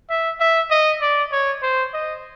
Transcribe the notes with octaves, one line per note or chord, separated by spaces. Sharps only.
E5
E5
D#5
D5
C#5
C5
D#5